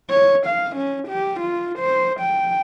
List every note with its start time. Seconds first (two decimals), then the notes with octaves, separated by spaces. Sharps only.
0.10 C#5
0.47 F5
0.76 C#4
1.09 G4
1.41 F4
1.79 C5
2.21 G5